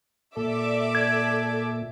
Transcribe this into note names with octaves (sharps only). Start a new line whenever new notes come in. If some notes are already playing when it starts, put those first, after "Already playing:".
A#2 A4 D5 E5 D6
G#6